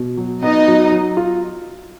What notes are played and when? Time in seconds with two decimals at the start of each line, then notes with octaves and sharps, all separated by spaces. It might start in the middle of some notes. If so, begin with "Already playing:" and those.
Already playing: B2
0.17 F#3
0.42 B3 D#4 D#5
0.68 F#3
0.92 F#3
1.17 F4